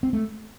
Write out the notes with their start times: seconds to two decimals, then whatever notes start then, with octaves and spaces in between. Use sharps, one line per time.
0.03 C4
0.13 A3